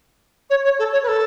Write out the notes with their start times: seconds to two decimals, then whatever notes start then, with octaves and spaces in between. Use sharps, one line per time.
0.50 C#5
0.64 C#5
0.79 A4
0.92 C#5
1.02 B4
1.07 A4